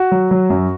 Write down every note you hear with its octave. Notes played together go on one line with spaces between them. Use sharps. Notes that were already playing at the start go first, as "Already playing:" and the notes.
Already playing: F#4
F#3
F#3
F#2